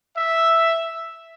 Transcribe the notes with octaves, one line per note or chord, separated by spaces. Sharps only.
E5